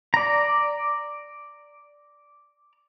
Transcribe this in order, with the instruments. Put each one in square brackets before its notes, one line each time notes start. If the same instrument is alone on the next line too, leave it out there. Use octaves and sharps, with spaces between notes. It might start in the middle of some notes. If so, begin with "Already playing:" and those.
[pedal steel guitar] D5 A#5